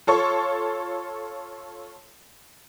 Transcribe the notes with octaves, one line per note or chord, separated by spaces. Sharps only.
F4 A4 C#5 C6 C#6